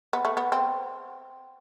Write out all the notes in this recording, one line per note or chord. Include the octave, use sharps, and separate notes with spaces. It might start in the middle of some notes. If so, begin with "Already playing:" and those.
B3
A3
B3
C4